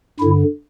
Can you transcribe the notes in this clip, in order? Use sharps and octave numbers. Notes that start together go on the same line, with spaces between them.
G2 D3 E4